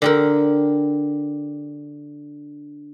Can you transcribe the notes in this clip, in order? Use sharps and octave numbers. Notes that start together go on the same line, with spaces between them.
D3 G4 A#4